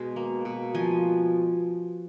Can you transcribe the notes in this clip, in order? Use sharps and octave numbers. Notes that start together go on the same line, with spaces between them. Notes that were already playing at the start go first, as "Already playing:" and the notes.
Already playing: B2 G#3
A#3
B2
F3 G#5